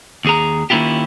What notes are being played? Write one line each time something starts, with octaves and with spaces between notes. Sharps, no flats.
D#2 G#4 A#5
D#3 A#3 C#4 E4 F4 G4